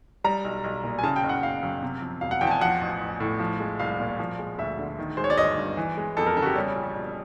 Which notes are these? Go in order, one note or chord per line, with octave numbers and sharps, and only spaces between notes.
G3 A#5
B1
B1
A#2
G#5
C#3 A5
G5
F#1
F#5
F#1 F5
F#2
C3
F3
E1 F5
F#5
E2 G5
A5
G#5
F3 F#5
A1
A1
A2
F3
G#3
C2 F5
A#2
F3
G#3
D2 E5
D3
D#3
G#3 C5
C#5
D5
G1 D#5
G2
E3
G#3
F2 A4
A#4
C#3 A4
F#4
G4
G3 C#4
A#1
A#1